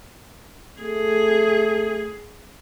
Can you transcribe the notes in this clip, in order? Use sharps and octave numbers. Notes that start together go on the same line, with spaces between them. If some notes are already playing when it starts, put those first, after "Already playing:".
A3 G#4